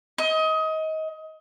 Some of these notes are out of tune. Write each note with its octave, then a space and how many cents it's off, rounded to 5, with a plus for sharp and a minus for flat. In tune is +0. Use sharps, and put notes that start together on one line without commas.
D#5 +25